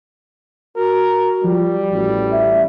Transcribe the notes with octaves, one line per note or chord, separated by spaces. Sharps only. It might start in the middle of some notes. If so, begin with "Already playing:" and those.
F#4 A#4
F3 G3
A1 F#4
E5